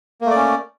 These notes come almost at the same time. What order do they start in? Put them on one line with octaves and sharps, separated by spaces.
A#3 A3 D5 C#4